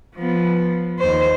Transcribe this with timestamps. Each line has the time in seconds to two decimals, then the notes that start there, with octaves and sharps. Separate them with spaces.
0.15 F3 B3
0.99 D#2 C5